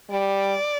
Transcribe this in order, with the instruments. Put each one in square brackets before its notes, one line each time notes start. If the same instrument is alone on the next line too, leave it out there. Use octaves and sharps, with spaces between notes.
[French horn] G3 [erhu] D5